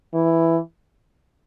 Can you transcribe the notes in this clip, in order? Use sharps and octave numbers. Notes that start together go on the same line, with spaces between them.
E3